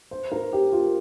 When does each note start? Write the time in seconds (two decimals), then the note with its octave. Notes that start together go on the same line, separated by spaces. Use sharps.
0.11 C5
0.32 A#4
0.53 G4
0.72 F4